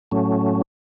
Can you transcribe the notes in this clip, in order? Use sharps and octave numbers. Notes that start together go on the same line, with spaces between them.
A2 F#3 A3 C#4